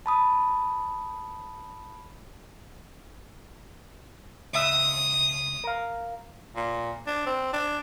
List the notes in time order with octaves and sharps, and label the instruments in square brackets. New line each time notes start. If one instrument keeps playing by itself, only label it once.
[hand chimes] A5 B5 D#6
[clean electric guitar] C#2 E5 [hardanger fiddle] D#6
[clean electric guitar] A#4 F5
[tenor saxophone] A#2
D4
C4
D4